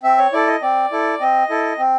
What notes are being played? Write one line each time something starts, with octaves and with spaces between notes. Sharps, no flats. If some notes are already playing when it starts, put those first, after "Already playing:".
C4 E5
C#5
E4 A4 D5
D#5
C4 D5
E4 A4
C4 D#5
E4 A4
C4